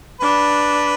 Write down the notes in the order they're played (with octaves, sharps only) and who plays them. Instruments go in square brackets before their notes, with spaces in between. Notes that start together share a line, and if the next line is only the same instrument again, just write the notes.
[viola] D4 [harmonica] B4